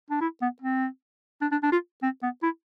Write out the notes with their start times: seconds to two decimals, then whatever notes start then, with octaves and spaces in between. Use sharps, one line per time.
0.10 D4
0.21 E4
0.42 B3
0.62 C4
1.41 D4
1.52 D4
1.63 D4
1.72 F4
2.03 C4
2.23 B3
2.43 E4